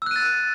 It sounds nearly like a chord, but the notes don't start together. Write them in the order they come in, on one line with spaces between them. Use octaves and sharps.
E6 F#6 D#7 A6